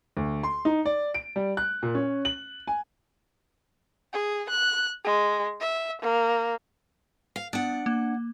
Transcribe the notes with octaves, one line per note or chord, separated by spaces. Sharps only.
D2
C6
D#4
D5
D7
G3
F#6
A#2
C#4
F#7
G#5
G#4
F#6
G#3
E5
A#3
F5
B3 D4 F#5
A#3